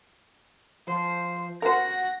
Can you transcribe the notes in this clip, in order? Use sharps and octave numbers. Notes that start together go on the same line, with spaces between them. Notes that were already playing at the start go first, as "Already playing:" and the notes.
F3 C5
F#4 A#4 C5 F#5 A#6